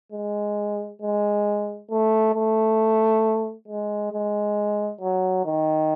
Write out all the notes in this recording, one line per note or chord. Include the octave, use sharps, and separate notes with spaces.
G#3
G#3
A3
A3
G#3
G#3
F#3
D#3